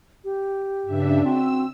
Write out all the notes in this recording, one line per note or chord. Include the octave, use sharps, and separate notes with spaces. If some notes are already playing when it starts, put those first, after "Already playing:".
G4
G2 C#3 D4 E5
C4 F#4 E6